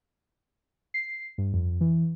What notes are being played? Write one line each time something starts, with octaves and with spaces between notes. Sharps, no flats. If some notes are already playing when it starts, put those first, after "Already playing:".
C7
G2
F2
E3